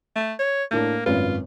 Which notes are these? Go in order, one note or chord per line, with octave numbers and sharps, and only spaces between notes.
A3
C#5
A2 A#3 D4 A#4
G#1 F#2 F4 B4